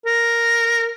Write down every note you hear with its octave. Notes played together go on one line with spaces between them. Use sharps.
A#4